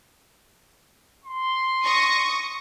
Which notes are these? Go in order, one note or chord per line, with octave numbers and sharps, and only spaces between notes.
C6
C#6 D#6 A#6